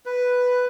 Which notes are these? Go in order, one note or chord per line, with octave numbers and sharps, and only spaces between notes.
B4